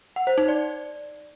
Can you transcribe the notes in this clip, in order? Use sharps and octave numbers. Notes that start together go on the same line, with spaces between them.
F#5
C5
D#4
D5